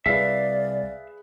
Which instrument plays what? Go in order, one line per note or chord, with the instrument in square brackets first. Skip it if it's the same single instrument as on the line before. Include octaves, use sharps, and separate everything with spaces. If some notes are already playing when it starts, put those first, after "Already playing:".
[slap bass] C2 [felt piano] G#4 B4 [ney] D5 [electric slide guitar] E5 F5